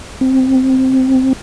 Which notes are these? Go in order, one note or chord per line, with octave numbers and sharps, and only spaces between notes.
C4